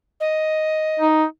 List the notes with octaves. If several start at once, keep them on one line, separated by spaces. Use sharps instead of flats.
D#5
D#4